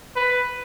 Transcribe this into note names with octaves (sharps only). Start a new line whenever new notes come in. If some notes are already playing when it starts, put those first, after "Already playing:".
B4